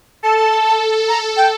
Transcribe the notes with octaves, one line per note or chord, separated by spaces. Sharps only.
A4 A5
A#5
G5